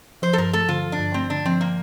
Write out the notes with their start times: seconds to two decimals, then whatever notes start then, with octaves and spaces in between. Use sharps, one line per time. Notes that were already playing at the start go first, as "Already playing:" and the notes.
0.22 F3 C5
0.33 A4
0.38 G2 A#4
0.53 A3 A4
0.68 D3 F4
0.84 F3
0.92 D4
0.99 G2
1.14 A3 C4
1.30 D3 D4
1.45 F3 C4
1.61 A#3